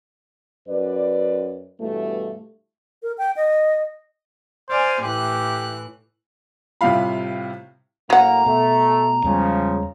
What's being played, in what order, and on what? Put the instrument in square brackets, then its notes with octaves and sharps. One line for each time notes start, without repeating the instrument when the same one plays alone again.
[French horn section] F#2 B4 D5
G2 B2 E3 A3
[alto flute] A#4
G5
D#5
[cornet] C5 [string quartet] D5 F5 G#5
[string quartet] A2 E3 F#6 [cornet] G4
[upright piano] A2 C3 G3 F4 F5 B5
[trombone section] A2 A#3 [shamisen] F#3 F#5 [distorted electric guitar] A#5
[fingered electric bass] B2 [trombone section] A3
[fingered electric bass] E2 G3 G#3 [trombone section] C#3 F3